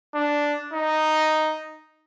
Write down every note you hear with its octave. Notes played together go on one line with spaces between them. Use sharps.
D4
D#4